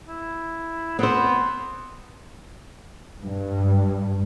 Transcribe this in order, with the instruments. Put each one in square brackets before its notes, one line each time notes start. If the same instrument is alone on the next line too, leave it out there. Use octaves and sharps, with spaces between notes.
[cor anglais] E4
[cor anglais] B3 [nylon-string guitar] C4 C5
[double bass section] G2